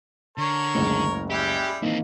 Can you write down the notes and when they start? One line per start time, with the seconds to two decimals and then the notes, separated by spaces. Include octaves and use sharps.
0.38 D3 A#4 C#5
0.75 F#1 C#2 A2
1.30 G3 G#3 E4 G4
1.82 D#3 E3 A#3 C4 D#5